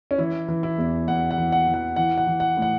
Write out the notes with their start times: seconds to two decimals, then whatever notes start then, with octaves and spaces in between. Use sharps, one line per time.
0.11 C#4
0.18 E3 E4
0.48 E3
0.63 E4
0.78 E2
1.08 E2 F#5
1.31 F#5
1.38 E3
1.52 F#5
1.67 E3
1.74 F#5
1.96 E3 F#5
2.18 F#5
2.27 E3
2.40 F#5
2.57 A2 F#5